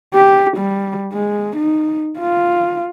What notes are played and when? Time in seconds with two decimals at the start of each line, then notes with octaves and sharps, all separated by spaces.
0.14 G4
0.57 G3
1.12 G#3
1.56 D#4
2.19 F4